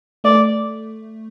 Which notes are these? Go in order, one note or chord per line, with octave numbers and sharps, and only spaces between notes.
A3 D5